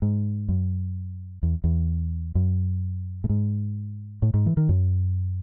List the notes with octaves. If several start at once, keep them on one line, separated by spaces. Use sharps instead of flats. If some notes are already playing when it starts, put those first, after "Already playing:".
G#2
F#2
E2
E2
F#2
A2
G#2
A2
G#2
E3
D#3
F#2